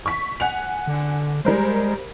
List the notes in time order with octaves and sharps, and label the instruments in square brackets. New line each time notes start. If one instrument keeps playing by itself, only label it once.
[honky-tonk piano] C#6 B6
F#5 G#5 F7
[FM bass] D3
[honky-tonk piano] G3 A#4 C5 [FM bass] G#3